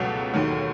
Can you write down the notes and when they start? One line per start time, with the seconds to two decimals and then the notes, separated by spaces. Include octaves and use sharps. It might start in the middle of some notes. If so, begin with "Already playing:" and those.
Already playing: C#2 B2 F#3 A3
0.34 D#2 D#3 F#3